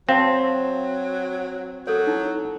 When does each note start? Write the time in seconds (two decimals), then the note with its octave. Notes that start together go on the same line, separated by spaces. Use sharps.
0.09 F#3 C4 F5 A5
1.87 F#3 A4 C#5
2.07 D#4 E4